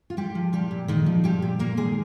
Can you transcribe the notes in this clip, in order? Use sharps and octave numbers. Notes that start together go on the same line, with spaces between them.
F4
G3 G#3 G4
F3
A#2 G3 G4
A#2
D#3 G#3 D#4
F3
A#2 G3 G4
A#2
G3 A#3 A#4
D#3 G#3 G#4